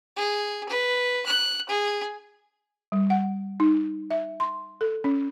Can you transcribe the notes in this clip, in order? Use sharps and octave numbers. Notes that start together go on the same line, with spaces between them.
G#4
B4
F#6
G#4
G3
F#5
D#4
E5
C6
A4
C#4